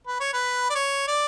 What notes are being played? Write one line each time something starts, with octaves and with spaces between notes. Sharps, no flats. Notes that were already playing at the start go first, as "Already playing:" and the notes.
B4
C#5
B4
D5
C#5
D5